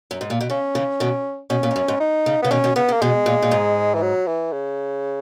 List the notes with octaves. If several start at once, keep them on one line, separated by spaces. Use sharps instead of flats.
F#2
G#2
A#2
B2
C#3 C#4
C#3 E3
B2 D#3
B2 C#4
A#2
G#2
F#2
G#2
D#4
C#3
C#3 B3
B2 D#3 C#4
B2 D#3
C#3 B3
C#3
A#3
B2 G#3
A#2
A#2
G#2
E3
F#3
E3
C#3